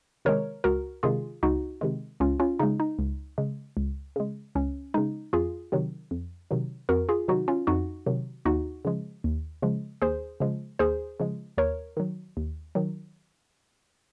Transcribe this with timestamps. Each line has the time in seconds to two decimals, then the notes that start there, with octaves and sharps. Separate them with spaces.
0.25 C3 D#3 G#3 A#4 C#5
0.64 C#2 F#4 A#4
1.03 C3 D#3 G#3 F4 G#4
1.43 C#2 D#4 F#4
1.81 C3 D#3 G#3
2.20 C#2 C#4 F4
2.40 C#4 F4
2.59 C#3 G#3 D#4
2.80 D#4
2.99 C#2
3.38 C#3 G#3
3.77 C#2
4.16 C#3 G#3
4.55 C#2 C#4
4.94 C#3 G#3 D#4
5.33 F2 F4 G#4
5.72 C3 D#3 F#3
6.11 F2
6.51 C3 D#3 F#3
6.89 F2 F#4 A#4
7.09 F4 G#4
7.28 C3 D#3 F#3 D#4 F#4
7.48 C#4 F4
7.67 F2 D#4 F#4
8.06 C3 D#3 F#3
8.45 D#2 D#4 F#4
8.85 C#3 F3 G#3
9.24 D#2
9.62 C#3 F3 G#3
10.02 D#2 G#4 C5
10.40 C#3 F3 G#3
10.79 D#2 G#4 C5
11.20 C#3 F3 G#3
11.58 D#2 A#4 C#5
11.97 D#3 F#3
12.37 D#2
12.75 D#3 F#3